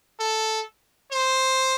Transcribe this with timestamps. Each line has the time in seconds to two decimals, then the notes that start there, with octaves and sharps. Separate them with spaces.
0.20 A4
1.12 C5